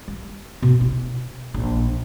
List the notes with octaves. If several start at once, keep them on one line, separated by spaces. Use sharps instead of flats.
G3
B2
E4
A#1